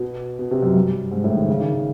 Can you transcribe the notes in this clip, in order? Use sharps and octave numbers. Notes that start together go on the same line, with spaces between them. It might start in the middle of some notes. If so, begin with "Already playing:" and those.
Already playing: B2
B2
C3
F#2
G2
G#2
A2
D#3
C#3
D#3
D#3